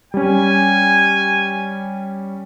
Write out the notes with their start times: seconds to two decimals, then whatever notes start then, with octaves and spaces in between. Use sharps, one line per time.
0.14 G3 C#4 G#5